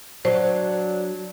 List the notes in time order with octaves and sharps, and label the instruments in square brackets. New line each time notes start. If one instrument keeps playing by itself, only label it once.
[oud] F#3 [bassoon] D4 [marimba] C5